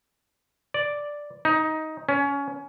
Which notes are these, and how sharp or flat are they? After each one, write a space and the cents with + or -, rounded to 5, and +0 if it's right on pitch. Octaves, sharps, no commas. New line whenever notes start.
D5 +0
D#4 +15
C#4 +20